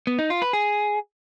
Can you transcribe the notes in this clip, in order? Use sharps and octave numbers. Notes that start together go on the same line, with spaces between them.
B3
D#4
F4
B4
G#4